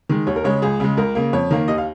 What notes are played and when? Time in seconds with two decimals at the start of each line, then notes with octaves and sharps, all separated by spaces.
0.09 D#3 G#3
0.27 D#2 C#5
0.36 A#4
0.44 C#3 G#3 C#5
0.62 C#2 G#4
0.80 C#3 G#3
0.97 C#2 A#4
1.15 C#3 A#3
1.33 F2 C#5
1.51 D#3 A#3
1.68 D#2 D#5
1.78 F5